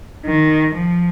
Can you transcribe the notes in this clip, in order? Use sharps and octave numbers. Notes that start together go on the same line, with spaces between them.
D#3
F3